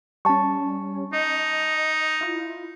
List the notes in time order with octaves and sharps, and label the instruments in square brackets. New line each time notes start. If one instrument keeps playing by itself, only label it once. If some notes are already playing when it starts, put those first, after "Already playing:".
[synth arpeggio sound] G3 C#4 [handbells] A5 C#6
[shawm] D#4 [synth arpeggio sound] D#5
[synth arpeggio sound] E4 F4